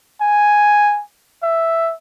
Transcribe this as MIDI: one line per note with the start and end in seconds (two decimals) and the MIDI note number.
0.21 1.02 80
1.43 1.93 76